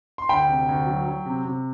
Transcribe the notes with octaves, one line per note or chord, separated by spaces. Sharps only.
C6
D2 G5 B5
C3
D2
F#3
F#3
C3
C3